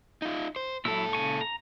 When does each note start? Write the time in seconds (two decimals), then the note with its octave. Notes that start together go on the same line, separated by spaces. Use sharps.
0.22 D#4 F4
0.56 C5
0.85 A#2 F#3 E4 A4 E6
1.13 C#3 G#5 C#6
1.41 A#5